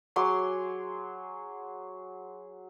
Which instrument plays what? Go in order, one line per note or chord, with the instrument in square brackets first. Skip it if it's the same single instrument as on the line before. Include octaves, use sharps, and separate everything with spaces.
[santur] F#3 G#4 C6 D6